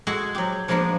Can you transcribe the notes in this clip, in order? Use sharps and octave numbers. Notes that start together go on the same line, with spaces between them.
G#3 F#4 G#4 A4
F#3 G4
F3 G#3 A#3 B3 D4